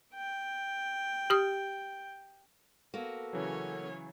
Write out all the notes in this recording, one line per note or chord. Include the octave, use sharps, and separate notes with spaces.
G5
G4 D#6
A#3 B3 F#4 A4
C#3 E3 F#3 C#4 C#5